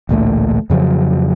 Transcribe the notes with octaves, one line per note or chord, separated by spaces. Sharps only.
A1 D2 A#2 A3
F2 C#3 F3 F#3